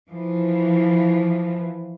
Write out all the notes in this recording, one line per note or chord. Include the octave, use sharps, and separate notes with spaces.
E3 F3